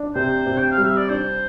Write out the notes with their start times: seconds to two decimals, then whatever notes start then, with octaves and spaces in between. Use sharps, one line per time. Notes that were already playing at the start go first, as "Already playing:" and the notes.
Already playing: D4
0.15 C3 C5
0.47 C3
0.58 G5
0.71 F5
0.78 G3
0.84 E5
0.97 D5
1.09 D4 C5